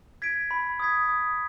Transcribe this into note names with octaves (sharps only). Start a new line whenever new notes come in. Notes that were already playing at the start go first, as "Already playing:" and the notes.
G#6 B6 D7
B5
D#6 G#6 B6
D#6